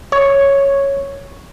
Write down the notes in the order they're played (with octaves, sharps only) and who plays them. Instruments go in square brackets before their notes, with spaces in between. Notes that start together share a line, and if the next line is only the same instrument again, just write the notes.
[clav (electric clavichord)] C#5